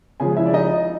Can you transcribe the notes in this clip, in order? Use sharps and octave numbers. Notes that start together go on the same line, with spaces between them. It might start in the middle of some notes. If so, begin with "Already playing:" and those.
C#3 F3 G#3 G#4 G#5
E4 E5
D5
D#4 D#5